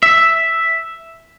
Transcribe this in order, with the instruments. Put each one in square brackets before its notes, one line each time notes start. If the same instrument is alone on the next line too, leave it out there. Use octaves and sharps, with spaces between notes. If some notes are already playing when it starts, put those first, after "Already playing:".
[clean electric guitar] E5